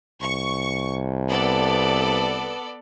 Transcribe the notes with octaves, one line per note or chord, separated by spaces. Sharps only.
C2 C#6
B3 A4 D5